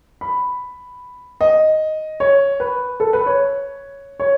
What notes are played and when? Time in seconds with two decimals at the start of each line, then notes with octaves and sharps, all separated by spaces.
0.21 B5
1.41 D#5
2.20 C#5
2.60 B4
3.00 A4
3.13 B4
3.26 C#5
4.20 C#5